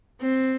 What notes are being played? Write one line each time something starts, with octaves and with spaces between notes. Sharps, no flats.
C4